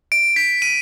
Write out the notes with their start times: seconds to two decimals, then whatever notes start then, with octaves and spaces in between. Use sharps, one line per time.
0.12 D7
0.36 B6
0.62 D#7